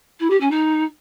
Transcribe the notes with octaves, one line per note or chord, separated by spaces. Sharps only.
E4
G4
C#4
D#4